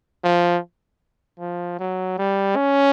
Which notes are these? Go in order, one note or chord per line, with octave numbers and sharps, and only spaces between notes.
F3
F3
F#3
G3
C#4